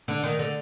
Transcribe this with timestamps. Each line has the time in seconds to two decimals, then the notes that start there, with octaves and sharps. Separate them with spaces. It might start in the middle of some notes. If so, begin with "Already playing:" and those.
0.08 D3
0.24 D#3
0.39 D3